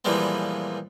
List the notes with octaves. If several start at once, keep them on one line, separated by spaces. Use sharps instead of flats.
A#2 E3 F3 G3 G#3 B3